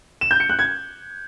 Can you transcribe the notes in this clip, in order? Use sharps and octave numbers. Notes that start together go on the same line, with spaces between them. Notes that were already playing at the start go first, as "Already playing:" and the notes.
E7
G6
C#7
F#6
G#6